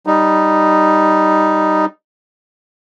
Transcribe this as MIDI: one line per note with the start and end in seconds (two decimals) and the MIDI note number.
0.07 1.85 55
0.07 1.85 63